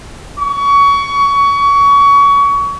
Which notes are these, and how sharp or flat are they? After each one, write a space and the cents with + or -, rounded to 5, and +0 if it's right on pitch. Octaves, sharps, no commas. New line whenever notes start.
C#6 +25